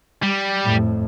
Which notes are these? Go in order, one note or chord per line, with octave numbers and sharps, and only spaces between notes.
G3
F2 A2